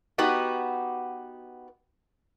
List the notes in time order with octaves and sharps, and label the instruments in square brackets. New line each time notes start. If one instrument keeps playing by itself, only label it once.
[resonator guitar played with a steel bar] B3 D#4 F#4 G4